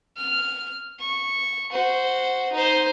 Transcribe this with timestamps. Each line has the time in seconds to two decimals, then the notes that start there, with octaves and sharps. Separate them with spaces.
0.17 F6
1.00 C#6
1.72 F#4 C5
2.52 D#4 C5